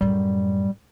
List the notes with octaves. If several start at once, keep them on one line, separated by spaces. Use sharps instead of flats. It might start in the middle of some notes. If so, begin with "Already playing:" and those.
F#2 A2 G3